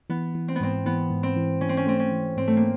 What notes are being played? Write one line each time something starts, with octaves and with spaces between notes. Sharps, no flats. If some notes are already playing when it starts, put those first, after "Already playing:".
E3 B3
E3
C4
B3
G#2 C4
E3 B3
G#2
C4
E3
E3 C#4
C4
C#4
A3 C4
C#4
E3
G#2 C4
A3
A#3